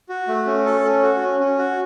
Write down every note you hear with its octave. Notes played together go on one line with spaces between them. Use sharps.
F#4
A3
C#4
A4
C#4
F#4
C#4
C#4
F#4